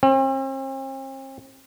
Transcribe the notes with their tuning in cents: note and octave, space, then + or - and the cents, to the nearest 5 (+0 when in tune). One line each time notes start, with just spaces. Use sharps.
C4 +45